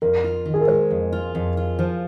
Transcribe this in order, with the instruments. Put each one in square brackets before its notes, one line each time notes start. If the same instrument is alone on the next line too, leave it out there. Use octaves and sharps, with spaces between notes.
[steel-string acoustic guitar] F2 [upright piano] A#4
[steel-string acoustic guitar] F4
D#3
[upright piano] G#4
A#4
[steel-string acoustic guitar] G#3 [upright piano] C5
[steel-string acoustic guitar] F2
F4
F2
F4
F3